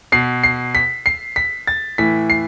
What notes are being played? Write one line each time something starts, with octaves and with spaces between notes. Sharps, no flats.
B2 C7
C7
B6
C7
B6
A6
A2 E3 B6
C7